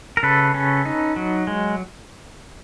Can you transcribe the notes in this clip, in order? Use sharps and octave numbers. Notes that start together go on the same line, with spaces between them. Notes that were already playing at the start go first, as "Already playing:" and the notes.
A#4
C#3 A4 B4
C#4
D#4
F#3
G#3